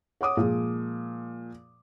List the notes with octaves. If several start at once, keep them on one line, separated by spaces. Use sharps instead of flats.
C#5 F#5 D6 D#6
A#2 F3 G#3